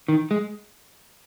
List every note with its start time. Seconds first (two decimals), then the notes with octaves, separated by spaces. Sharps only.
0.08 D#3
0.31 G#3